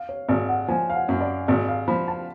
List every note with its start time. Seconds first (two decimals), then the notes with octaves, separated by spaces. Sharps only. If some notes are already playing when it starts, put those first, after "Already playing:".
Already playing: F5
0.09 C#5
0.28 G#1 D5
0.48 F#5
0.68 F3 G#5
0.90 F5
0.95 F#5
1.09 F#2
1.21 D5
1.48 G#1 D5
1.68 F5
1.88 F3 B5
2.08 A5